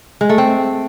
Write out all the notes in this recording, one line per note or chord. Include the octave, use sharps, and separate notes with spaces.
G#3
A3
C4